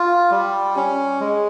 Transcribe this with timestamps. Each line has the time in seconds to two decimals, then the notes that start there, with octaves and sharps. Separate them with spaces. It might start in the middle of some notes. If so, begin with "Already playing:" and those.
Already playing: F4
0.31 G3
0.76 C#4
1.21 G#3